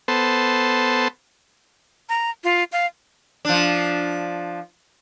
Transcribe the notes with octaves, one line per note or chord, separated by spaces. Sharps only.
B3 A4 C5
A#5
F4
F5
F3 D4